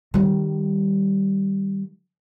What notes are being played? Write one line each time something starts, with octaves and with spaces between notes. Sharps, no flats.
D#3 G3